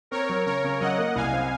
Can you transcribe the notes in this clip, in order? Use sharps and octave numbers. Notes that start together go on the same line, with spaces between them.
C4 A#4 C#5
F#3
C#3 A#4 C#5
C#3
F#3 D#5 F#5
A#3
C2 F5 G#5
C4